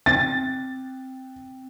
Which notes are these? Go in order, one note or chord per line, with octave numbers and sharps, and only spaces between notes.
C4 A6